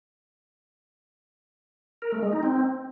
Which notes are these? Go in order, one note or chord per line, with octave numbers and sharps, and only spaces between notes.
A#4
A3
G#3
D#4
C4